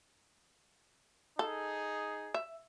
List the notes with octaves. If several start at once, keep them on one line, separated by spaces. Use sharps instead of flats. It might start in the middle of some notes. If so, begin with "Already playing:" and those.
D#4 G#4 A4
E5